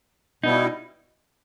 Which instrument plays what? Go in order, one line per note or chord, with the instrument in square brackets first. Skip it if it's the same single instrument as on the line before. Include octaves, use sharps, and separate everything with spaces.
[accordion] B2 G3 B3 E4 [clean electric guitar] D#4